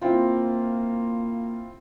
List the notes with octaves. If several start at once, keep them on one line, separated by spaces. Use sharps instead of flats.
A#3 C4 E4 F4